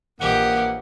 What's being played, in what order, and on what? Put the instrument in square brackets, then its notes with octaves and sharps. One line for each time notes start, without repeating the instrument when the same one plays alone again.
[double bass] A#1 E3 [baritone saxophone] A#3 [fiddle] G4 D#5 [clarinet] F#5